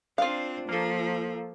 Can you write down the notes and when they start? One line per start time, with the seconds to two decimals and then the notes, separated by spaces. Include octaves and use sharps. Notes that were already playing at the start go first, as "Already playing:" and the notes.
0.18 C4 D4 F4 F5
0.69 F3 A#3 A4